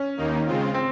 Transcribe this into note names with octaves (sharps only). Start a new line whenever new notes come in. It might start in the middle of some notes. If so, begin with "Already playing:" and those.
Already playing: C#4
D#2 D#3 A#3 D#4
C#3 G#3 C4 F4
C4